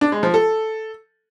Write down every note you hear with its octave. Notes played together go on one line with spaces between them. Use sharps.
D4
G#3
F3
A4